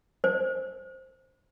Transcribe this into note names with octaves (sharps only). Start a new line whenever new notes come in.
C5